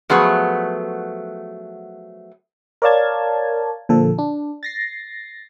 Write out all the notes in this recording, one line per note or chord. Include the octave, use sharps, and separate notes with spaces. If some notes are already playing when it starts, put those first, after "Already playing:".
F3 F#3 A3 B3 G#4
A#4 C#5 D5 F5 A5 G#6
A#2 D3 F3 A4
D4
A6 A#6 C7